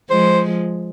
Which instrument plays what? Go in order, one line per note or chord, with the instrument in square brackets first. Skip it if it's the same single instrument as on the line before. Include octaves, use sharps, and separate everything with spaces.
[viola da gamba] F3 G#3 [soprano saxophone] C5